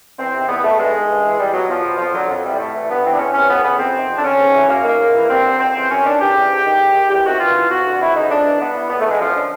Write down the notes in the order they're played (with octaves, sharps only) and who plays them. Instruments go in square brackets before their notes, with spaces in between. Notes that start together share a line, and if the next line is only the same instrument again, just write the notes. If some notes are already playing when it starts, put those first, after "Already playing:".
[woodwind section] E2 C4
C3 D#3
E2 B3
B2 A3
G2 G#3
D#3
G2
E3
E2 G3
B2 F#3
E2 F3
B2
F2 F3
D3 F#3
F2
C3 E3 G3
A2 A3
E3
G2 B3
E3 C4
D4
E2 C#4
C3 E3 C#4
F2 B3
C#3 E3 B3
F2 C4
C3 D#3
F2
D4
D3 C#4
G#2
E3
F#2 A#3
D#3 A#3
G#2
E3
G2 C4
D3
F2 C4
C#3 E3
F#2 C#4
D#3 D4
E2 G4
C#3 E3
G#2
D#3
G#2
D#3
E2 G4
C3 D#3 F#4
G2 F4
E3
F2 F#4
D3
F2 E4
C#3 E3 D#4
F2 D4
C3 E3
G2 B3
E3
A2 B3
A3
E3 G#3
F#2 F3
D3